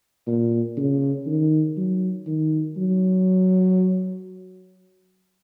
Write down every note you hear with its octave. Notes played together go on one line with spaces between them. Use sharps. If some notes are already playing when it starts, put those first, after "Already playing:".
A#2
C#3
D#3
F#3
D#3
F#3